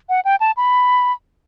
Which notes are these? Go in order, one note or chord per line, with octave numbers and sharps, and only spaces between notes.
F#5
G5
A5
B5